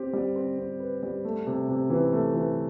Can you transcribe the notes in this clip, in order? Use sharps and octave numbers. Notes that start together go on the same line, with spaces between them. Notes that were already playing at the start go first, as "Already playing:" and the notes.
Already playing: C4 G4
G3
C4
C4
B4
G3
A3
C3
C3
E3
A3
E3